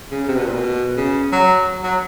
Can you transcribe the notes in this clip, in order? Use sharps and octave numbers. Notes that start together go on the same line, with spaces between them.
C#3
C3
B2
A#2
B2
C#3
F#3
F#3